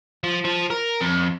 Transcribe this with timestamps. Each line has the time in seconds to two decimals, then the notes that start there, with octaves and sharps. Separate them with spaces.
0.24 F3
0.45 F3
0.71 A#4
1.01 F2